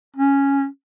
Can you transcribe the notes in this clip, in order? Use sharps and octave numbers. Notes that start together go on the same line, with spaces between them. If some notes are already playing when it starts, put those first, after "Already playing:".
C#4